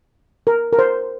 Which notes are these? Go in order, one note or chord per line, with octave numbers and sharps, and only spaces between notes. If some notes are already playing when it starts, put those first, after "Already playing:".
A#4
A#4
C5